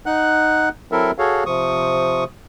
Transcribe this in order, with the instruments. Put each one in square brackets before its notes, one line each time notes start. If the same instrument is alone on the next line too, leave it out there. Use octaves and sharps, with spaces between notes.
[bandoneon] D#4 F#5 F#6
F#3 C4 E4 A4 A#4 E5
F#4 G#4 A4 C#5 F5
C3 F3 C#6 D#6